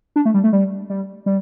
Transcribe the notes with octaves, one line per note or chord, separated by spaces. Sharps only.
D4
A3
G3
A3
G3
G3
G3